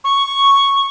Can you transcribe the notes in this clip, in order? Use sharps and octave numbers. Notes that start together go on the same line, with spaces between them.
C#6